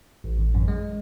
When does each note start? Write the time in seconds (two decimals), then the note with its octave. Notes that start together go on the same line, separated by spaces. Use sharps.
0.24 A1
0.39 A1
0.54 F#2
0.68 G#3